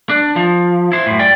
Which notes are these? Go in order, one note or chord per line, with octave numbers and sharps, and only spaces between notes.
D4
F3
E4 C5
F#2 A2
D5 G5